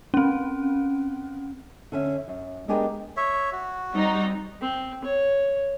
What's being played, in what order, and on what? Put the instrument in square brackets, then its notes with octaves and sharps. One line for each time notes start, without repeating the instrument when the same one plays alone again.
[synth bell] C4 C#4
[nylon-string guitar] D3 C#4 E5
F#2
G#3 B3 D4 G4 G#4 A#4
[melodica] C#5 E5
F#4
[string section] G3 C4 D#4
[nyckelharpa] C4
C#5